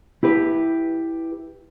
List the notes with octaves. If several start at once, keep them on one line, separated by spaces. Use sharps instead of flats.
E4 G4 B4